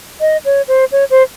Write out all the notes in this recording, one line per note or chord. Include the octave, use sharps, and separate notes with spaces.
D#5
C#5
C5
C#5
C5